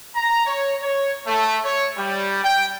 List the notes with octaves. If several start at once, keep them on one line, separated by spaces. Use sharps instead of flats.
A#5
C#5
C#5
A3
C#5
G3
G5